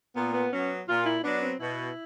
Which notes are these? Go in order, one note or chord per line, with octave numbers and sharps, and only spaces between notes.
A#2 B3
B3
F#3 B3 C#4
A#2 F4
E4
F#3 B3 D4
C4
B2 E4